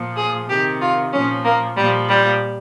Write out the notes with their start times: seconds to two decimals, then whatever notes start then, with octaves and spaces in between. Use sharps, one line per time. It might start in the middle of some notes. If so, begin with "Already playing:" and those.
Already playing: A#2 F3
0.16 G#4
0.48 C3 D#3 G4
0.81 F4
1.12 A#2 F3 C#4
1.44 A#3
1.76 A#2 F3 G3
2.08 G3